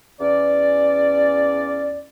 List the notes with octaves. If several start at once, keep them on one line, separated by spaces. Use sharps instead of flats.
E2 C#4 D5